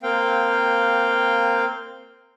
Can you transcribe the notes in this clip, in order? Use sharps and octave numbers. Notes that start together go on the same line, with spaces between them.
A#3 C4 F5 G5